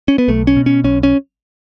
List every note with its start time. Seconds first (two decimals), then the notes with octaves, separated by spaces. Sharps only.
0.08 C#4
0.18 B3
0.28 B1 A3
0.47 C#4
0.56 B2
0.66 C#4
0.84 B1 C#4
1.03 C#4